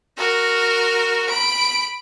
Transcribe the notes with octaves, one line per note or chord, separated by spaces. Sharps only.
F#4 A#4
B5 D7